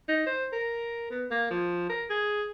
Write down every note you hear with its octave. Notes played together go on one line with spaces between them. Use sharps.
D#4
C5
A#4
B3
A#3
F3
A#4
G#4